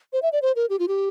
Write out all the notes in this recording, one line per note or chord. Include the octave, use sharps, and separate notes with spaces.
C5
E5
D5
C5
A#4
G4
F4
G4